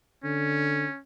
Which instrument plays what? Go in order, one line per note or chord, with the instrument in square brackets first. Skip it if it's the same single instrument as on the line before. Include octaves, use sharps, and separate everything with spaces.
[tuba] D3 [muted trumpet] C#4